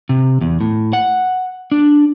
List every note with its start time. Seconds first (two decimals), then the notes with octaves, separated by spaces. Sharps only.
0.09 C3
0.41 E2
0.61 A2
0.93 F#5
1.72 D4